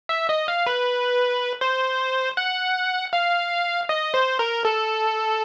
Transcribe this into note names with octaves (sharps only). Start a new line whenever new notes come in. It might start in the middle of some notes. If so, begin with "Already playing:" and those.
E5
D#5
F5
B4
C5
F#5
F5
D#5
C5
A#4
A4